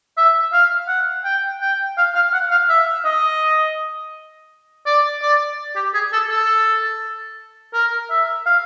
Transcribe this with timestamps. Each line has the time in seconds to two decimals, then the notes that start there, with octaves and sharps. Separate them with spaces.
0.17 E5
0.53 F5
0.88 F#5
1.25 G5
1.61 G5
1.98 F5
2.15 F5
2.33 F#5
2.51 F5
2.69 E5
3.05 D#5
4.86 D5
5.22 D5
5.76 G4
5.94 G#4
6.13 A4
6.30 A4
7.74 A#4
8.11 E5
8.46 F5